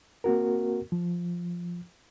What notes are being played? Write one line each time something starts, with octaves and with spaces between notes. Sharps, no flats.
A#3 C4 F#4 A#4
F3